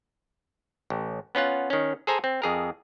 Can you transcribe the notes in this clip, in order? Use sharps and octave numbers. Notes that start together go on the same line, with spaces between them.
A1
B3 C#4 F4 F#5
D#3 C#4
G#4 A4 C5 G#5 A#5
C4
F2 G#4 A#4